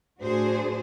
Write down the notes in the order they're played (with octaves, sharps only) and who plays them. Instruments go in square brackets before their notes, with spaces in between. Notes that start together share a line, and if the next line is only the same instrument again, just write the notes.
[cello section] A2 D4 F#4 G#4 C5